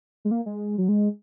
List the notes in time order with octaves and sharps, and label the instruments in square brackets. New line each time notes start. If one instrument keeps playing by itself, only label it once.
[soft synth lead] G#3
A#3
G#3
F#3
G#3